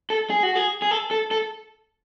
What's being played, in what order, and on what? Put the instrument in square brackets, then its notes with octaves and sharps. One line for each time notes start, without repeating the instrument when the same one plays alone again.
[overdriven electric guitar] A4
G#4
F#4
G#4
G#4
A4
A4
A4